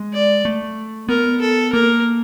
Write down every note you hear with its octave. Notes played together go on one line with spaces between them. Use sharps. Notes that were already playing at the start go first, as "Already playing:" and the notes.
Already playing: G#3
D5
A3
B3 A#4
A4
A#3 A#4